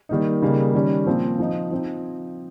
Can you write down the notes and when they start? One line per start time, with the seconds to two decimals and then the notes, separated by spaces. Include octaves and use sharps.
0.09 D#3 G3 A#3 D#4
0.42 C#3 G3 A#3 D#4
0.74 D#3 G3 C#4
1.07 A#2 F3 C4
1.39 F3 C4 D#4
1.71 F3 C4 D#4